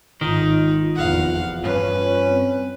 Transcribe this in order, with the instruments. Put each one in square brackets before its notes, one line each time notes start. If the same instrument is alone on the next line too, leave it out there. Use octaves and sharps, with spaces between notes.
[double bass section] G#1 [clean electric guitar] D#3 [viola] D#4 [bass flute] F4
[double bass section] F1 E2 [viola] F5 F#5
[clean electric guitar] G2 [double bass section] C#4 [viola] B4
[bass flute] C4